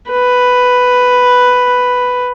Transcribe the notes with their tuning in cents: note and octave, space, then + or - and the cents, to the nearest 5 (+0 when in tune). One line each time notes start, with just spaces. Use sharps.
B4 +5